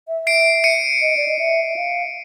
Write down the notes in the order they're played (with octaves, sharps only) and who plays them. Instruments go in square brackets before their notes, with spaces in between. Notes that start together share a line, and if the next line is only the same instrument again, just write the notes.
[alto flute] E5
[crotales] C7 D7
C#7 D#7
[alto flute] D#5
D5
D#5
E5
E5
F5